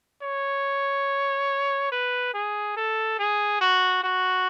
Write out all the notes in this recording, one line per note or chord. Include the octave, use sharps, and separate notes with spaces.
C#5
B4
G#4
A4
G#4
F#4
F#4